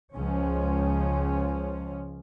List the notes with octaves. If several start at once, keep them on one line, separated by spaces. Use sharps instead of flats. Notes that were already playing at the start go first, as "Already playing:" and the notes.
C#2 F3 C#4